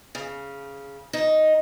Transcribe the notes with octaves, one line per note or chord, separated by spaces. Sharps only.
C#3
D#4